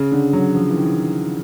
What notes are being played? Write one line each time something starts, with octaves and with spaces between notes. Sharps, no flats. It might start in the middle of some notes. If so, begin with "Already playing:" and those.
Already playing: C#3
D3
F#3
F3
E3
D#3